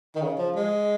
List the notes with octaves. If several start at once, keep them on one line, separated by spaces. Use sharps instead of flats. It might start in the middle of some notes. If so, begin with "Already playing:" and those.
D#3
C#3
F3
G#3